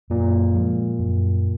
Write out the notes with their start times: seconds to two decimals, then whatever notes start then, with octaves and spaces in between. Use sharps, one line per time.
0.10 F#2 A#2
0.54 F3 G#3
0.99 F#2